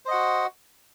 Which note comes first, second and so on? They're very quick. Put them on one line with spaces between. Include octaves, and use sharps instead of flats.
C5 D#5 F#5 F#4